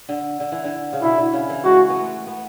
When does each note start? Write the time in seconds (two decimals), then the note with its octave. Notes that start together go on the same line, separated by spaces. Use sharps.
0.09 D3
0.40 D3
0.52 E3
0.64 D3
0.93 C#3
1.02 B2 E4
1.18 D3
1.33 C#3
1.49 E3
1.64 G#3 F#4
1.89 B3
1.96 A3
2.27 B3